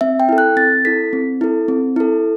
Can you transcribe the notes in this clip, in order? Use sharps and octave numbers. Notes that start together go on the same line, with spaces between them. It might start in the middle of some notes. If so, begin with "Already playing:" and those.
C4 E5
G5
E4 A4
F#6
C4 A6
E4 A4 B6
C4
E4 A4
C4
E4 A4